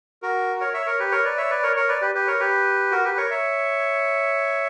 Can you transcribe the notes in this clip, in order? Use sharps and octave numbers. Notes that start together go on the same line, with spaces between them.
F#4 A#4
A#4 C#5
C#5 E5
A#4 C#5
G4 B4
A#4 C#5
B4 D5
C#5 E5
B4 D5
A#4 C#5
A#4 C#5
B4 D5
G4 B4
G4 B4
A#4 C#5
G4 B4
F#4 A#4
G4 B4
A#4 C#5
C#5 E5